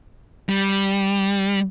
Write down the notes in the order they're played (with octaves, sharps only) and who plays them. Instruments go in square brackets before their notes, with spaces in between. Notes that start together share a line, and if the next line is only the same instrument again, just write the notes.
[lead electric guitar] G3